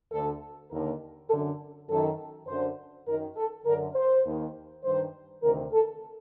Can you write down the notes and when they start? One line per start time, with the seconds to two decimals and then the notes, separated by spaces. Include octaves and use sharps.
0.12 D2 D3 A4
0.71 D#2 D3 A#4
1.30 F#2 D3 A4
1.89 F#2 D#3 A4
2.47 F#2 D3 C5
3.07 F#2 D#3 A#4
3.36 A4
3.66 F#2 D3 A#4
3.95 C5
4.25 D#2 D#3
4.84 G2 D#3 C5
5.42 D2 C3 D#3 A#4
5.73 A4